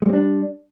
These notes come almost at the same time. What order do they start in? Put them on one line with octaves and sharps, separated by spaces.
G#3 G3 C4 D4